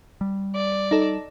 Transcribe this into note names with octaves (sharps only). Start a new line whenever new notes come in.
G3
D5
D#4 A4